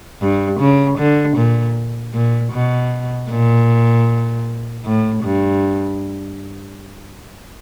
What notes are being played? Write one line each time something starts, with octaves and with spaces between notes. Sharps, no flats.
G2
C#3
D3
A#2
A#2
B2
A#2
A2
G2